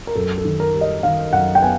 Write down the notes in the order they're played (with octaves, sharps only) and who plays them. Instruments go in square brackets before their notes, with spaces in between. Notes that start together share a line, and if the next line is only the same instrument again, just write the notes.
[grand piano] A#4
F#2 A4
A4
D#3
A#4
G3
D#5
D#3 F5
F#2 F#5
G5
B3 G#5